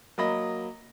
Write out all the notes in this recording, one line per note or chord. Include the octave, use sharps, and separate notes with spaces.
F#3 A#3 D#5 B5 A#6